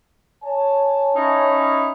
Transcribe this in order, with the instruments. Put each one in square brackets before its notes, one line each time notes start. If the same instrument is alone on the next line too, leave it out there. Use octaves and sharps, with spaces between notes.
[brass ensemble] C#5 G#5 A5
[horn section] C#4 D#4 E4